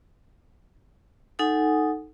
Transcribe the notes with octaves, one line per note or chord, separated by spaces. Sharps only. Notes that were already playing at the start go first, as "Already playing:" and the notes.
D#4 A4 F#5 G#5 D#6